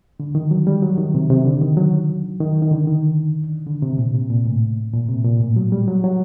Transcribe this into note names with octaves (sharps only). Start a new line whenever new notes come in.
D3
D#3
F#3
G3
F#3
D#3
C3
C3
D3
D#3
F#3
D#3
D#3
D3
D#3
D3
C3
A#2
C3
A#2
A2
A#2
C3
A#2
A2
F#3
G3
F#3
F#3